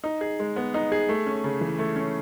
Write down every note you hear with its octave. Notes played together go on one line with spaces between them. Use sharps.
D#4
G#4
G#3
B3
D#4
G#4
A3
C#4
C#3
E3
A3
C#4